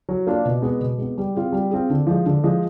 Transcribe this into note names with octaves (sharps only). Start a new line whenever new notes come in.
F#3
A#3 D4 F4
B2
G#3 B3
B2
G#3 B3
G3
C4 F4 G#4
G3
C4 F4 G#4
D3
F3 G#3
D3
F3 G#3